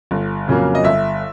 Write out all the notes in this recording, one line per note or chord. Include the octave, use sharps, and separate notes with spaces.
G1
F2 C#3 F#3 A#3
D#5
G1 E5